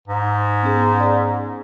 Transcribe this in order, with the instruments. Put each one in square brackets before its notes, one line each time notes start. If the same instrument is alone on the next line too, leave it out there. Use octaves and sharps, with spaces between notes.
[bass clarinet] G#2
[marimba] B3 C#4 G#4
G#4 D5